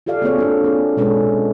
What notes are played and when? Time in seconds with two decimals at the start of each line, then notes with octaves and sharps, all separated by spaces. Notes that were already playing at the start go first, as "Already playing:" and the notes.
0.06 F4 G4 A4 D5 F5
0.22 A#3 C4 F#4 G#4 A4 C#5
0.38 D4 A4
0.64 A#3 C4 G#4
0.97 B2 G#3 C#4 A4 B4 C#5